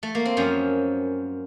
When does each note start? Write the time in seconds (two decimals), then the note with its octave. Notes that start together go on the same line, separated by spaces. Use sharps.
0.03 A3
0.15 A#3
0.25 C4
0.37 F#2 F3 C#4